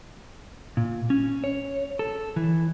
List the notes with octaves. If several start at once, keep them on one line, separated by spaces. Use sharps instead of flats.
A#2
C#4
C#5
A4
E3